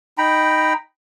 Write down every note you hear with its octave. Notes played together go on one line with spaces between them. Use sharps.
D#4 G5 A#5 B5